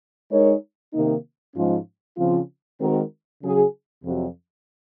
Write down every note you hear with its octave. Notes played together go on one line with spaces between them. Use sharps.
G#3 D#4 A#4 C#5
C3 D#3 A#3 D#4
G#2 F3 G#3 C#4 F4
C#3 F3 C4 F4
D#3 G#3 C4 F#4 A#4
C#3 F#3 C#4 G#4
F2 C3 F#3